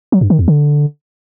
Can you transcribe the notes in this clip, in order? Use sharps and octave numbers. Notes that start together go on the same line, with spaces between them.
F#3
G2
D#3
E2
D3